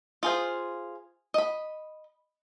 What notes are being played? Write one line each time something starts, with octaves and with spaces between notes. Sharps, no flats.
F4 G#4 C5
D#5 B5